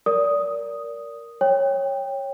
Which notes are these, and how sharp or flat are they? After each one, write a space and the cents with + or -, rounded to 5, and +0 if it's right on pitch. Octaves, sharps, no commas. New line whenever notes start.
A#4 +0 D5 -25 D#6 +0
C#5 -10 G5 +15